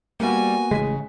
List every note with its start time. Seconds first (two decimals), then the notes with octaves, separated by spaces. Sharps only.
0.20 G3 A#3 B3 F#4 G#5
0.71 A1 C#3 G#3 B6